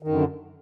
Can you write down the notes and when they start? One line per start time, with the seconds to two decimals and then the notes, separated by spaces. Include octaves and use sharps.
0.03 D#3
0.08 F#2
0.13 D3